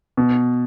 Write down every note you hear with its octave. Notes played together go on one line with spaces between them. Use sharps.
B2